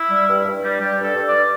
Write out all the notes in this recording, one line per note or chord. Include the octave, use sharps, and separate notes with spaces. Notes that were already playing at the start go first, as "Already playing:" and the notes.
Already playing: E4
G3
G2
G2
G3
G3 G4
G2
A4
G2
D5
G3